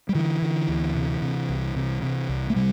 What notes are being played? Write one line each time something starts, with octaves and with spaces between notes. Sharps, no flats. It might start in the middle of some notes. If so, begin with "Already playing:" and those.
G3
D3 E3
D3
D2
C3
C3
C2
C3
C3
C2
A3
C3 G3